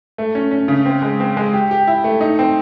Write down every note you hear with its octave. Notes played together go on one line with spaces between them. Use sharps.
A3
C#4
C#4
C#3
C4
G#3
C4
G#3
G4
G4
E4
A3
D#4
C4